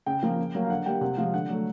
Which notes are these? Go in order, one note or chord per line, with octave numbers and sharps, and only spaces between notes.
C#3 G5
F3 A#3
C#3
F#3 A#3
F5
D3 F#5
G3 A#3 G5
C3 F#5
F3 G#3 F5
D3 F#5
F#3 A3